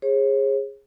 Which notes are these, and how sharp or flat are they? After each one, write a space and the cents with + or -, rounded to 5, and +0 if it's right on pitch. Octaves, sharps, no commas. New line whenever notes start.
G#4 -15 C#5 -40